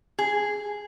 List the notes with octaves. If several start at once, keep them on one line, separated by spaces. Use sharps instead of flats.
G#4